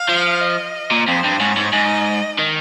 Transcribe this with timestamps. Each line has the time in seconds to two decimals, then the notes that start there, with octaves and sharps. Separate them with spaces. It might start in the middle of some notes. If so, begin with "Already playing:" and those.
Already playing: F5
0.09 F3
0.41 D#5
0.91 A#2
1.07 F2 C5
1.24 G2
1.40 G#2 C#5
1.57 G#2
1.73 G#2 D#5
2.38 D#3